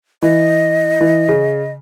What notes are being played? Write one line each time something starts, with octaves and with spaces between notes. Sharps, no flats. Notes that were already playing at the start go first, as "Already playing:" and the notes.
E3 D#5
E3
C#3